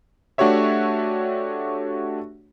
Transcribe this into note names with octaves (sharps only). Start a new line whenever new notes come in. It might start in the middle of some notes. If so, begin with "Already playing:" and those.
A3 D4 F#4 G4 C#5 E5